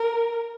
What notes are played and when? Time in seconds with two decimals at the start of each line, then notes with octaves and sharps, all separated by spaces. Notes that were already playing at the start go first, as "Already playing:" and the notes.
Already playing: A#4